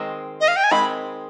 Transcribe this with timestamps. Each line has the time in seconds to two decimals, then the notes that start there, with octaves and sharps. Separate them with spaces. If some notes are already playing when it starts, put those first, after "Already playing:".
Already playing: D#3 G#3 C4
0.41 D#5
0.48 F5
0.56 G5
0.64 G#5
0.71 D#3 G#3 C4 B5